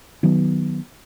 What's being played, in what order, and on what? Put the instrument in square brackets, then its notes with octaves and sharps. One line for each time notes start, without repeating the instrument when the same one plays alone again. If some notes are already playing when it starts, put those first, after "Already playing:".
[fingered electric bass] D#3 F#3 B3